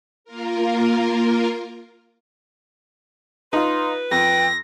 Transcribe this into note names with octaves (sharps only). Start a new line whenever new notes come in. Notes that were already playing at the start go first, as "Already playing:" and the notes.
A#3 F4 A#4
D#4 F4 B4 C6
F2 G5 A#6